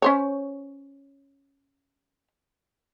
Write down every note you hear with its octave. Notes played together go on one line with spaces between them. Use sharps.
C#4 C5 C#5